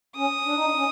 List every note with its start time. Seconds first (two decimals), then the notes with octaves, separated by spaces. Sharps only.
0.16 C#4 D#6
0.46 D4
0.56 D#4
0.65 D4
0.75 C#4